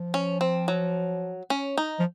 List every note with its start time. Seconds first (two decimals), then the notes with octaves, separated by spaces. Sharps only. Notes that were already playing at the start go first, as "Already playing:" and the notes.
Already playing: F3
0.14 C#4
0.41 C4
0.68 F#3
1.50 C#4
1.78 D#4
1.99 F3